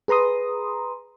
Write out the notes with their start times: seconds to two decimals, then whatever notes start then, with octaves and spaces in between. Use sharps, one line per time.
0.08 G#4 B4 A#5 C6 D#6